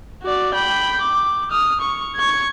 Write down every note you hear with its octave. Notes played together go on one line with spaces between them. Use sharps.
F#4 D5
G5 B5
D6
D#6 F6
C#6
C#6 G#6